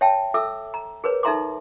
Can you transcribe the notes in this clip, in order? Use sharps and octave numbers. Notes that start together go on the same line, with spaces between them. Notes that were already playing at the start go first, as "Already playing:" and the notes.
C#5 E5 G5 A5
A4 E5 D6 E6
A#5
G#4 A#4 B4 C#5
D#4 A4 E5 A#5 C6 D6